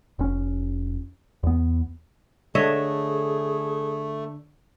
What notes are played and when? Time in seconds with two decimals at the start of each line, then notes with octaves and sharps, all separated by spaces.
0.19 F1 C#4
1.43 E2 B3
2.55 D3 A3 D4 G#4 C#5 D#5 E5